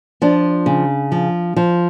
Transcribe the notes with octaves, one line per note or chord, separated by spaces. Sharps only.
F3 D4
C#3
F3
F3